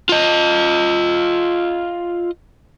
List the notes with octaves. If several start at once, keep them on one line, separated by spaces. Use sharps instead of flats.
F4 D#5